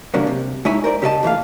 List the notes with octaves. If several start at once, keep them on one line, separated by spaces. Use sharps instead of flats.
E2 C#3 F#3 G3 A#3 D4
C3
G#3 D#4 E4 C#5 G#5 B5
A#4 C5 D5
C#3 G4 A4 C5 D#5 A5
A#2 E3 A3 F5